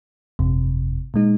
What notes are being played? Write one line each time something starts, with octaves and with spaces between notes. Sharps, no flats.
G1 F2 C3
A#2 G#3 D#4